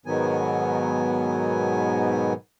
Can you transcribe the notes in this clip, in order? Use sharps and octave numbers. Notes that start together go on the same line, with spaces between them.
G#2 B2 D#3 F#3 B3 G#5